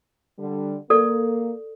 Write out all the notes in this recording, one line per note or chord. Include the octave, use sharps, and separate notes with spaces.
D3 G3
A#3 A4 D5